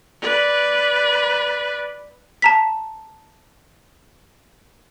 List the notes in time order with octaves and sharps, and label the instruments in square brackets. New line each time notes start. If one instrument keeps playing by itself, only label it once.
[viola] B4 D5
[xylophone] A5 A#5 B6